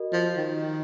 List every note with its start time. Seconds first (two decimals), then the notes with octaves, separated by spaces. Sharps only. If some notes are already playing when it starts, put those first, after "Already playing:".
Already playing: F#4 A#4 D#5
0.12 F3
0.37 D#3